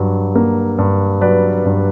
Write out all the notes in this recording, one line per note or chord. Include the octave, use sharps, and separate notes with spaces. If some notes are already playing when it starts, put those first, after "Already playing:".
Already playing: G2 F#3
A#3
G2
F#3 B4 D5
G2